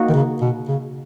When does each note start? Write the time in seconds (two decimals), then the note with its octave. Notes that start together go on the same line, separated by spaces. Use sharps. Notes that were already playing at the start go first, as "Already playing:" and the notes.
Already playing: A#3 D#4 F#4
0.09 D#3
0.14 C#3
0.41 B2
0.68 C#3